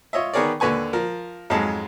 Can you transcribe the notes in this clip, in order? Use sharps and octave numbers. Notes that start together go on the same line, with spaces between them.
F4 C#5 D#5 E5
D#3 B3 G#4 A#4 C#5 D5
D#2 D3 B4 G#5 C#6
F3 A#4
F2 G#2 F#3 G#3 A5